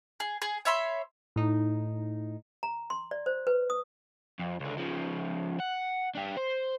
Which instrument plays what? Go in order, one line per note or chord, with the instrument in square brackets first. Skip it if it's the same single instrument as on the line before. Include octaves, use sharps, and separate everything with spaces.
[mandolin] G#4
G#4
C#5 E5 B5 C6
[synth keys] A2 D#4
[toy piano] A#5
C6
D5
C5
B4
D#6
[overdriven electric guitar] F2
C#2 D3
C#3 F3
F#5
D4 G4
C5